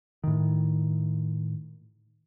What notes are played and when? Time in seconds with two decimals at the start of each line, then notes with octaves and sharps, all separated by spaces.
0.24 A2 D#3